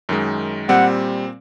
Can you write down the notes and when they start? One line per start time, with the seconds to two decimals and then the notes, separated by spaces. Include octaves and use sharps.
0.09 F#2 D#3 G#3
0.69 A#2 G3 C4 F#5